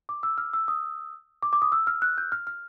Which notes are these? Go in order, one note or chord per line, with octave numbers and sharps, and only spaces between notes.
D6
E6
F6
E6
D#6
D6
D6
D#6
E6
F6
F#6
G6
F6
F6